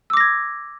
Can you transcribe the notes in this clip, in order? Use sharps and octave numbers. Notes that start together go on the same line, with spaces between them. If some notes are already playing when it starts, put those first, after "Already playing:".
D6 E6 G#6 A#6